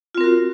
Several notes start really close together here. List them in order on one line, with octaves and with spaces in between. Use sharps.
F4 C4 A#4 F#4